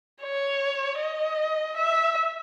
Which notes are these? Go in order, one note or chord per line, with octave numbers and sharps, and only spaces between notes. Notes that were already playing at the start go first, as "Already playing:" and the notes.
C#5
D#5
E5